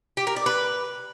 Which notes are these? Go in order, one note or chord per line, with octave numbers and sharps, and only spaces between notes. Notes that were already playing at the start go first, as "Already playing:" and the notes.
G4
A#4
D5
B4